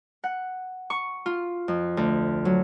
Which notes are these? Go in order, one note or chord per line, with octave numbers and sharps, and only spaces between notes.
F#5
C#6
F4
F2
D2
F#3